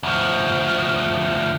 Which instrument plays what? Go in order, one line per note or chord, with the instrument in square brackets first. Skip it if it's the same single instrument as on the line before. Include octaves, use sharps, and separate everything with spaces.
[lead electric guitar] D2 F3